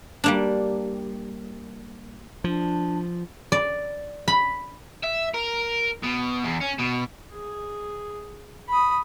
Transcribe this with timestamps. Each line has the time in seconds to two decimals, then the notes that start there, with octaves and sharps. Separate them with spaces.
0.24 G3 A#3 D4
2.44 F3 D4
3.52 D5
4.28 B5
5.04 E5
5.34 A#4
6.03 B2
6.45 E2
6.61 C#4
6.79 B2
7.32 G#4
8.69 B5 D#6